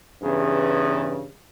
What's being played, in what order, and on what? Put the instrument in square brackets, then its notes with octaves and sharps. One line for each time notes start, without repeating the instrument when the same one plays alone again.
[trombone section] E2 G2 C#3